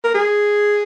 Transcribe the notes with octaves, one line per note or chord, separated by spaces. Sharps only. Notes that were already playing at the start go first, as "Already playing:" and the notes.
A#4
G#4